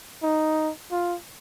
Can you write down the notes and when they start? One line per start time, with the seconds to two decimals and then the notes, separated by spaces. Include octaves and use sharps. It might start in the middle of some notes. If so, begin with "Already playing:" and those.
0.23 D#4
0.92 F4